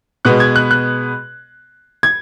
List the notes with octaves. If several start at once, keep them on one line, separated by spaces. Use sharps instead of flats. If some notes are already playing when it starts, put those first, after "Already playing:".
B2 G#3 B3 F#6
G#6
F#6
F#6
G#6